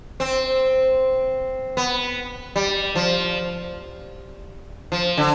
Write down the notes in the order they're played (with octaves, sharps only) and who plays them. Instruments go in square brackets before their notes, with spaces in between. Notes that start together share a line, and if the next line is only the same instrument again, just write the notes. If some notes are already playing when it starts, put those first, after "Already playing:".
[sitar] C4
B3
G3
F3
F3
D3